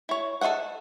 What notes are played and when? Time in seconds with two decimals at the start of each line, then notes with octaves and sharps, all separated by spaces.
0.09 E4 C#5
0.41 A4 C5 D#5 E5 F#5